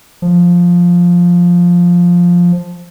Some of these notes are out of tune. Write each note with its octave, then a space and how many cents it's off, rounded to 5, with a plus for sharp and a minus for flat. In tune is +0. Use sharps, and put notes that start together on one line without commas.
F3 +5